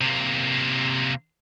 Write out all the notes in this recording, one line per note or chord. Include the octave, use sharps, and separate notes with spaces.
C3 A#3